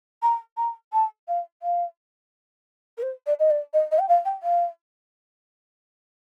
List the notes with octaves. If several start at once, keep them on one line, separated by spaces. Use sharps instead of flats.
A#5
A#5
A5
F5
F5
A#4
C5
D5
D#5
D5
D#5
D#5
G5
F5
G5
F5